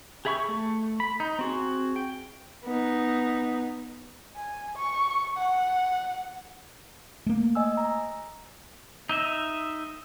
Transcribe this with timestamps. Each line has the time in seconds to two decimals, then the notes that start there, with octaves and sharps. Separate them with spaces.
0.25 G4 G#4 E5 B5 C#6
0.48 A3
1.00 B5
1.20 D#4
1.39 C4 F#4 G#4
1.96 G5
2.64 B3 D#4
4.36 G#5
4.76 C#6
5.38 F#5
7.26 A3 A#3
7.55 D#5 G#5 E6
7.77 A#5
9.09 D#4 D#5 E5